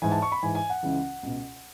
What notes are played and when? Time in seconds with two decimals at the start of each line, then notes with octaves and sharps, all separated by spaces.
0.02 G#2 E3 G#5
0.12 A5
0.22 C#6
0.32 B5
0.43 G#2 E3 G#5
0.55 G#5
0.70 F#5
0.83 C#2 C#3 E3
1.23 C#2 B2